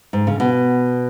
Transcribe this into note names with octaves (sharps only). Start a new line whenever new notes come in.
G#2
C#3
B2